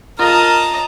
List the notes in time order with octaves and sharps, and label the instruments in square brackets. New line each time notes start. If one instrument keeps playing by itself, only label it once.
[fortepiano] F4 [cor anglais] A#4 [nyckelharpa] D#5 A5 [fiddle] A#5